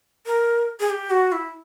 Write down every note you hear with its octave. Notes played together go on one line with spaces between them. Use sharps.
A#4
G#4
G4
F#4
E4